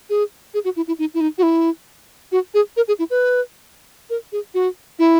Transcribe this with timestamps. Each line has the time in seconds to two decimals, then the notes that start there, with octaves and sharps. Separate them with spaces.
0.10 G#4
0.54 G#4
0.65 F#4
0.76 E4
0.88 E4
0.99 D#4
1.14 E4
1.21 D#4
1.38 F#4
1.43 E4
2.32 F#4
2.54 G#4
2.77 A#4
2.88 G#4
2.99 E4
3.10 B4
4.10 A#4
4.32 G#4
4.54 F#4
4.99 E4